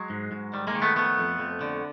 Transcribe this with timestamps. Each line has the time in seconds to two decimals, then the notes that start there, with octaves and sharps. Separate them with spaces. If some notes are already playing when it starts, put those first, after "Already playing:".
Already playing: F#3 G#3
0.10 G#2
0.32 G#2
0.54 D#3 G3
0.67 G#3 A#3
0.75 D#3
0.82 A3 B3
0.96 F3 A3 B3
1.18 F2
1.39 F2
1.61 D3